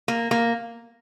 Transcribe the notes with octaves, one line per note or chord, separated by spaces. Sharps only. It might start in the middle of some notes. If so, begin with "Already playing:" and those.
A#3
A#3